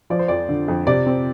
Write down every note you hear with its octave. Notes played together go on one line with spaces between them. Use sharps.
F3 D5
C5
F2 D5
D3
F2
C3 D5
C4